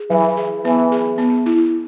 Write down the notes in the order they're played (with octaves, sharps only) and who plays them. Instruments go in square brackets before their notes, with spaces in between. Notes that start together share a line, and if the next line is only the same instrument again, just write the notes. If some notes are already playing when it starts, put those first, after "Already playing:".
Already playing: [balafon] G#4
[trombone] E3 [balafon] F#3
[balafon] G#4
[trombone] E3 [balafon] B3
[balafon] G#4
B3
E4